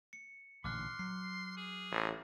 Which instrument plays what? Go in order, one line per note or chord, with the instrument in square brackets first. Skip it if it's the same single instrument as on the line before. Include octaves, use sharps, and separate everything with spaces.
[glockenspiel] C#7
[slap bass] A1 A#2 D3 [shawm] C6 [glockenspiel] D6 F6 F#6
[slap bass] F#3 [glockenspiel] C7
[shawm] G#4
[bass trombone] A1